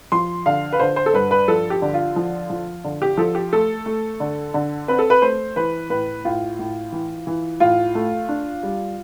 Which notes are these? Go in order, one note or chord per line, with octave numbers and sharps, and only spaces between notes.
F3 C6
D3 F5
B4
D3 C5
C5
A4
G2 B4
B4
F3 A4
G4
D3
F4
F3
F3
D3
G4
F3 A4
G4
A3 A4
A3
D3
D3
C4 B4
A4
B4
A3 C5
E3 B4
A2 B4
A2 F4
A2
E3
E3
A2 F4
A3
D4
G3